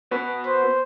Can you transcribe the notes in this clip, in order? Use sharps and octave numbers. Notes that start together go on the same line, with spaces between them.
B3 F#4 B4
C5